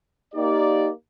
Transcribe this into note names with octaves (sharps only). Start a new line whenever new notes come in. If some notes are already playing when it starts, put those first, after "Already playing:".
A#3 D#4 G4 D5